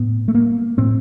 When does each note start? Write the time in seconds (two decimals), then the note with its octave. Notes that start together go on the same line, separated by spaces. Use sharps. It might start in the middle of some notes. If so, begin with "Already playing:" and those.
Already playing: A2 B3
0.28 A3
0.35 A#3
0.78 A2 C4